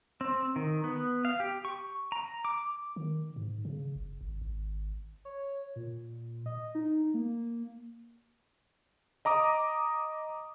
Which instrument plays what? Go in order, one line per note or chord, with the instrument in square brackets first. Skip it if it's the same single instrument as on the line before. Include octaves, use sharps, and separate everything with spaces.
[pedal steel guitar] C4
D#3
B3
F5
G4
C#6
A#5
D6
[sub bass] D#3
G#2
C#3
F#1
G#1
G#1
[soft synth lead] C#5
A#2
D#5
D#4
A#3
[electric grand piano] D#5 A#5 D6 D#6